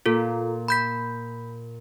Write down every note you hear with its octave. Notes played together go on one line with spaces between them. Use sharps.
A#2 F4 A4
B5 G6 B6